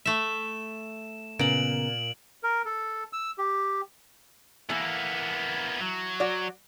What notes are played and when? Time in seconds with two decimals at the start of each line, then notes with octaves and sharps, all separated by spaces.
0.06 A3 E5 E7
1.39 A#2 C#3 B3 A#4 D7 F#7
2.43 A#4
2.65 A4
3.13 E6
3.38 G4
4.70 E3 A#3 B3 A4
5.81 F#3
6.20 F#4 D5